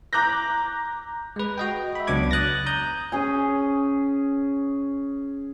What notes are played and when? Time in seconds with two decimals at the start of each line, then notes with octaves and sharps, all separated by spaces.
0.13 A#5 D6 F#6 G6 A#6
1.36 G#3 B4
1.58 F#4 D#5 G5
1.95 E5 B5
2.07 C#2 F#3 B3 D4 D6 G#6
2.31 D#6 F#6 A6 A#6
2.66 A#5 D#6 G6
3.12 C#4 G#4 G#5